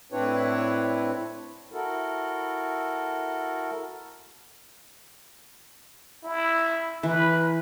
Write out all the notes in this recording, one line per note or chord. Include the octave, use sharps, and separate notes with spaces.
A2 C4 D4 E4 B4 C#5
E4 F#4 A4 A#4
E4
E3 B4